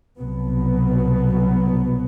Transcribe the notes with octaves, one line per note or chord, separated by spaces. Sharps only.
C2 B2 F#3 B3